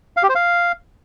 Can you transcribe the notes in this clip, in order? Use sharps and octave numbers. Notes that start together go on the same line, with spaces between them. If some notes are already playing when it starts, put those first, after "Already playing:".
F5
G4
C5
F5